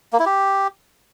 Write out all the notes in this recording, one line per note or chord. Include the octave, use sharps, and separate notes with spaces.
A#3
E4
G4